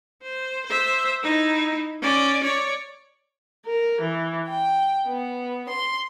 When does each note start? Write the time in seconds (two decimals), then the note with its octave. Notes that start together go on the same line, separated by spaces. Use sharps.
0.23 C5
0.66 C5 E5
1.23 D#4 E4
2.02 C#4 D5
2.43 C#5 D5
3.65 A#4
4.00 E3
4.49 G5
5.06 B3
5.69 C6